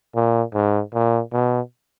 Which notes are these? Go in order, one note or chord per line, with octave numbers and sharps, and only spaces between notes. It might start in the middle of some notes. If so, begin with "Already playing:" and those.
A#2
G#2
A#2
B2